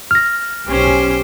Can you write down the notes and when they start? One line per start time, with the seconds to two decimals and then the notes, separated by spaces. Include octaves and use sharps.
0.11 F6 A#6
0.67 B1 C#4 G4 C5